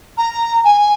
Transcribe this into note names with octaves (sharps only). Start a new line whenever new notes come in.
A#5
G#5